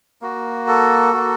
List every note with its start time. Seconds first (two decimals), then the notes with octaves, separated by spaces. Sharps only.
0.22 A#3 F#4
0.68 A4
1.13 A#3 F#4